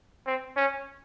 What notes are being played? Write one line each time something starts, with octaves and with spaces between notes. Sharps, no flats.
C4
C#4